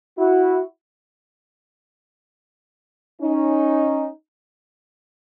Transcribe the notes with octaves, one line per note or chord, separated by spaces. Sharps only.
E4 F#4
C#4 D#4